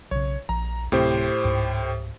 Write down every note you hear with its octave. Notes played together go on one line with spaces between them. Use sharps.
B1 C#3 C#5
A#1 A#5
D1 A2 C3 C4 G4 C5
C#2 G#2